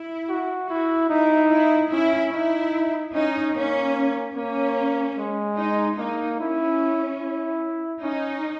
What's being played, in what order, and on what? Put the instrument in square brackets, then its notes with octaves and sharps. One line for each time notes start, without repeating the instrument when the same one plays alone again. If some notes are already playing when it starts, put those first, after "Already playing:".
Already playing: [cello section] E4
[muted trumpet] F#4
[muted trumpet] E4 [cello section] F#4
[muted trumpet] D#4 [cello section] E4
[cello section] E4
[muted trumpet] C#4 [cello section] E4
[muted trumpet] D#4 [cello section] E4
[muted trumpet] C#4 [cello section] D#4
[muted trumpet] A#3 [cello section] C#4
[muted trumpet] A#3 [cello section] C#4
[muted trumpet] G#3
[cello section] D#4
[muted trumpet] A#3 [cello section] D#4
[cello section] C#4 [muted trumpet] E4
[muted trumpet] E4
[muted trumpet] C#4 [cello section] D#4